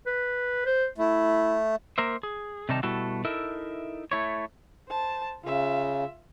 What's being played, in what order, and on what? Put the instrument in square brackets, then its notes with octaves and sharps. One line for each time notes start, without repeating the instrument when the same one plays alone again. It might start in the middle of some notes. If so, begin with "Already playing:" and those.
[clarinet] B4
C5
[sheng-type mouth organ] A3 [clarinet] E4
[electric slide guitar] A#3 A#4 C5 E5
G#4
C3 D#3 G3 D#4 A5
B2 G3 A3 E4 F#4 A4
D#4 E4 A4 A#4 E5
A3 E4 C#5
[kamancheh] C5 A5
[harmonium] C#3 [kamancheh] F4 E5